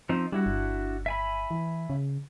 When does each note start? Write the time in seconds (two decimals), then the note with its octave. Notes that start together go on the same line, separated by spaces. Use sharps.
0.09 F3 C4 D#4
0.32 G3 D4 E4 F#4
0.46 G1
1.06 E5 G#5 B5
1.51 E3
1.90 C#3